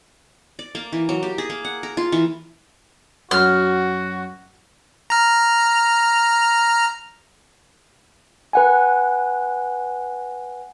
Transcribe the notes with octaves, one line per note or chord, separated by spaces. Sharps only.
D5
A#3
E3
F#3
G4
G#4
A#3
F#5
A#4
F4
E3
F#2 F#4 F6
A#5 F6
B4 F#5 G#5